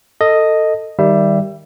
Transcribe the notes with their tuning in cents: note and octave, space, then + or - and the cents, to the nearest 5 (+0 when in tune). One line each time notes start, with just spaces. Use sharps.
A4 +20 D#5 +0
D#3 +0 G3 +0 E5 +25